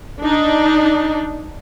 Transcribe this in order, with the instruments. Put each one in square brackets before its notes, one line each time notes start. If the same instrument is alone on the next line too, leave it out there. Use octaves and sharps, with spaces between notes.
[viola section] D4 D#4